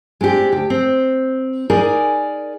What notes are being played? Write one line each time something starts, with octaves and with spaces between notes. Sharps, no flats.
G#3 C4 D4 G4
D2 G4
C4
D#4 G#4 A#4 D5 G#5